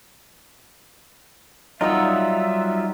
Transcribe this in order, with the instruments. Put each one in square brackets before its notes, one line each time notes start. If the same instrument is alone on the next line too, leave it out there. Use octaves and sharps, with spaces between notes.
[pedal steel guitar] F#3 G3 F4 [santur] D#4 F#5 E6 [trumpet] E5